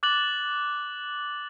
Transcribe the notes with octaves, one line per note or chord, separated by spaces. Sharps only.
D6 F#6 A6 F#7